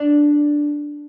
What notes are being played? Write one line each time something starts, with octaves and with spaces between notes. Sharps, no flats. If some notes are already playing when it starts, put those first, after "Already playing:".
Already playing: D4